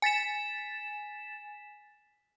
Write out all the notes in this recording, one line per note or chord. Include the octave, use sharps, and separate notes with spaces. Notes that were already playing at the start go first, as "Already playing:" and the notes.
G#5 A6 B6 E7